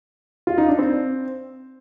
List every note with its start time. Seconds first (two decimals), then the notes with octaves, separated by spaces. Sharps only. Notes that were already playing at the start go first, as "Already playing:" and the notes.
0.47 F4
0.58 D#4
0.68 D4
0.79 C4